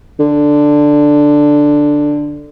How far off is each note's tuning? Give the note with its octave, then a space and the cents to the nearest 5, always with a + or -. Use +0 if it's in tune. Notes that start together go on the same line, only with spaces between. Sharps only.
D3 +5